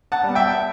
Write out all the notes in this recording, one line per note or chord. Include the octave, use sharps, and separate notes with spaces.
F#5 A5
G3 B3
E5 G5